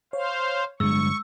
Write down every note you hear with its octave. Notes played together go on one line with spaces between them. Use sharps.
C5 C#5 F5
G2 D3 F#3 G#3 C#6 E6